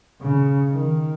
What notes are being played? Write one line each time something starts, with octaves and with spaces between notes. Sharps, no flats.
C#3
D#3